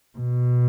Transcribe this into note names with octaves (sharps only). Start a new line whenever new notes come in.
B2